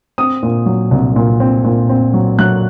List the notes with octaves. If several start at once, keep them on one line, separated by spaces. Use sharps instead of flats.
C4 D#6
A#2
F#3
C2
A#2
C4
A#2
C4
F#3
F#3 F#6